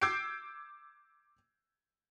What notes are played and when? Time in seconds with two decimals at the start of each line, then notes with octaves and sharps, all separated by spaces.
0.02 D6 E6 G6 G#6 C7 D7